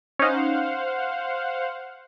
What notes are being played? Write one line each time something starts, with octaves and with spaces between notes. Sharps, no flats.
C#4 D#4 C5 F5 F#5